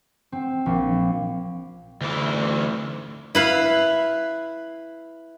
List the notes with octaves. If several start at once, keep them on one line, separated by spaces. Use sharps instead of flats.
C4
A#1
D2 E3
E4 B4 F5